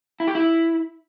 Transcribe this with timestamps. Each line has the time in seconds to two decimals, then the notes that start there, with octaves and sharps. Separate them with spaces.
0.20 E4
0.28 G4
0.35 E4